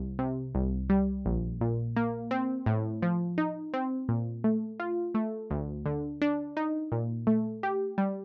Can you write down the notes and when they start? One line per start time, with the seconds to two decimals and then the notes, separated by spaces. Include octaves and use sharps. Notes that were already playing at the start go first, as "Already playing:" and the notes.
Already playing: C2
0.19 C3
0.55 C2
0.89 G3
1.26 A#1
1.61 A#2
1.96 A#3
2.31 C4
2.66 A2
3.02 F3
3.38 D#4
3.74 C4
4.09 A#2
4.44 A3
4.80 F4
5.15 A3
5.50 D2
5.86 D3
6.22 D4
6.57 D#4
6.92 A#2
7.27 A3
7.63 G4
7.98 G3